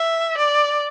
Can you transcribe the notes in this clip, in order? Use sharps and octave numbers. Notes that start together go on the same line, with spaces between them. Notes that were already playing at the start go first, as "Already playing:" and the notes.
Already playing: E5
D5